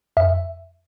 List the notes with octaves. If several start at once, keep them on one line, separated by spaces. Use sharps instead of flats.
F2 E5